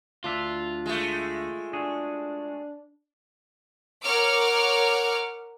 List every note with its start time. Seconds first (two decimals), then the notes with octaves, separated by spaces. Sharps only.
0.24 D2 D4 F4 E5
0.86 G#3 A3
1.73 D4 F#4 G#4
4.03 A#4 C#5 F#5 D6 F6